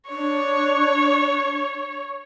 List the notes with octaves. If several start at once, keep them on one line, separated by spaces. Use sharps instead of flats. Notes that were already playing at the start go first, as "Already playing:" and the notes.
D4 C#5